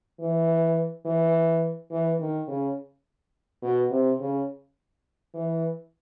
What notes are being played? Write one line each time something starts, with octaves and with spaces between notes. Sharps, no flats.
E3
E3
E3
D#3
C#3
B2
C3
C#3
E3